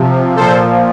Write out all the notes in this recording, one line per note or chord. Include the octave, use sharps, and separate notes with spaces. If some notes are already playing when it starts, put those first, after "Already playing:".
Already playing: C3 F3
A#2 F3 A4 C5